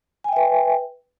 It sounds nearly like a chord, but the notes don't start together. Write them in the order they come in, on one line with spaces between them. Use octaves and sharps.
G#5 G5 E5 B4